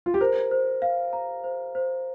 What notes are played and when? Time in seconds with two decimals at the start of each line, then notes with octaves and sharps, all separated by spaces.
0.06 F4
0.14 G4
0.21 A#4 C5
0.51 C5
0.82 F5
1.13 A#5
1.44 C5
1.75 C5